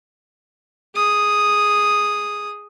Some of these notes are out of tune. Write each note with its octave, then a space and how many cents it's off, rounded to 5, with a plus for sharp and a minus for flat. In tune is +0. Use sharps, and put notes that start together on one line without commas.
G#4 +0 D#6 +0